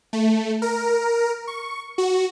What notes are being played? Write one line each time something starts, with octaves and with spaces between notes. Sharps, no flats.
A3
A#4
C#6
F#4